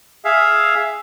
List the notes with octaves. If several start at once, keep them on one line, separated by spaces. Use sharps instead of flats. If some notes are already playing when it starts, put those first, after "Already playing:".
G#4 E5 F5